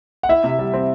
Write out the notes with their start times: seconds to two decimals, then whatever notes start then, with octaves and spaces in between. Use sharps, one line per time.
0.23 F#5
0.29 E4 E5
0.44 C3
0.59 G3
0.74 C4